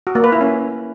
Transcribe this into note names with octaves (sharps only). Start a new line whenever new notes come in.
F#4
A#3
B4
E4
C#4